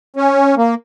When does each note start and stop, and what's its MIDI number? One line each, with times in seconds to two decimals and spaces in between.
0.16 0.55 61
0.57 0.75 58